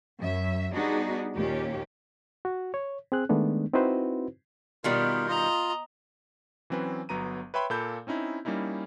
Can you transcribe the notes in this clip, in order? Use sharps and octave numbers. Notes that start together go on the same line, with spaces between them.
F#2 E5
G3 B3 D4 D#4 F#4 G#4
D#2 A#2 C#4 G4
F#4
C#5
C4 G#4 F#6
D#3 G#3 A3 B3 D4
C4 D#4 E4 F#4 B4 C5
B2 D#3 G3 B3 F4 A#4
F4 D#5 A#5
E3 F#3 C4 C#4 B4
G1 F#3 B3 A#5 D#7
B4 C#5 E5 G5 B5 C6
A#2 A#3 A4 B5 G6
C4 C#4 D#4 E4
G3 A#3 C#4 D#4 E4